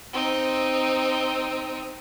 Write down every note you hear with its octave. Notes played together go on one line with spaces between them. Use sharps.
C4 D#4